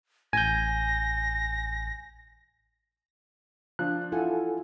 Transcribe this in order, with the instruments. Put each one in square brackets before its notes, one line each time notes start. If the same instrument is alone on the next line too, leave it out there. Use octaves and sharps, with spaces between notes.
[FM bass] A1 [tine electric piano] G#5 G6 [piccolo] A#6
[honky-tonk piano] F3 D4 [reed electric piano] F#6
[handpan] E4 F4 [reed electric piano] A4 F#5 G#5